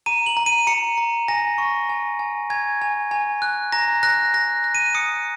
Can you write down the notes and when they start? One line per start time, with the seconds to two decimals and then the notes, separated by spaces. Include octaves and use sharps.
0.06 A#5 D#7
0.26 F#7
0.37 A#5
0.46 D#7
0.67 A#5 C#7
0.98 A#5
1.28 G#5 A#6
1.58 C#6
1.89 G#5
2.19 G#5
2.50 G#5 G#6
2.82 G#5
3.11 G#5
3.42 F#6
3.72 A#5 A#6
4.03 F#6 A#6
4.34 F#6 A#6
4.64 F#6
4.75 D#7
4.95 D#6 C#7